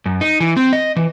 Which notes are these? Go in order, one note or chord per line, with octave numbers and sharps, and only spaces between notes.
F#2
D#4
E3
C4
D#5
E3